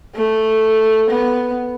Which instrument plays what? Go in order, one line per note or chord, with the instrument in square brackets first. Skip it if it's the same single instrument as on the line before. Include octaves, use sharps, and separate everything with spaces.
[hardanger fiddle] A3
B3